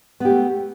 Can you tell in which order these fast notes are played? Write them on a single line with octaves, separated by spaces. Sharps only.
B3 G4 A3